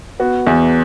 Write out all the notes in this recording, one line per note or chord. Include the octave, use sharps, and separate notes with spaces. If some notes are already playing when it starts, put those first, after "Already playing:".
B3 F#4
E2